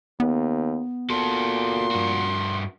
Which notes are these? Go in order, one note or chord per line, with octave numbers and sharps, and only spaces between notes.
D#2 B3
A#2 F#4 A4 C6
G2 F#4